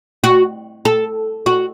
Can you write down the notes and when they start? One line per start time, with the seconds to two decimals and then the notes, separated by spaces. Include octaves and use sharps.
0.24 F#4
0.85 A4
1.46 F#4